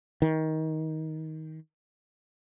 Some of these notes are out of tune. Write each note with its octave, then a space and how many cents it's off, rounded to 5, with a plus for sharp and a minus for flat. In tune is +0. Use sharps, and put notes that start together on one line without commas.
D#3 +20